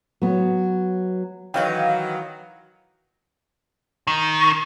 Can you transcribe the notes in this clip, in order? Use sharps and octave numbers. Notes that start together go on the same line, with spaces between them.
F#3 B3
D#3 E3 F#3 D#4 B4 F5 G5
D#3